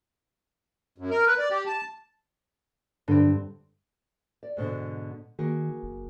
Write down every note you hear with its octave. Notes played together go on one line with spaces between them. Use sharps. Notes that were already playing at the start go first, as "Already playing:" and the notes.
F#2
A#4
B4
D5
G4
A5
G2 D3 C4
D5
G#2 B2 D3
D#3 A#3 F#4 G#4
F#1